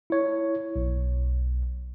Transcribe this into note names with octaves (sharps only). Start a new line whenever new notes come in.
E4 C#5
B1